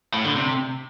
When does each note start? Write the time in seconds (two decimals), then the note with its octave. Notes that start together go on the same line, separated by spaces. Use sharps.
0.14 A2
0.25 D3
0.36 C3